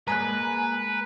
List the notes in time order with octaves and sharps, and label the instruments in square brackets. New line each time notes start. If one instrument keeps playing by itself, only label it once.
[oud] G#3 A#3 D5 [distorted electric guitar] B4 [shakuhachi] G#5 [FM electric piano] A#5 F#6